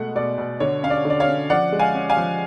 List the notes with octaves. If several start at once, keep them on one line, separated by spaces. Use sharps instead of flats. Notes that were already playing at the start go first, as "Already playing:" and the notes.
Already playing: B2 G#3 A3 F#5
B2 D5
B2
D3 C#5
C#4 F5
D5
D3
D5
C#5 F5
C#4
F3 D5 F#5
G#3
F5 G#5
C#4
F5 G#5
F3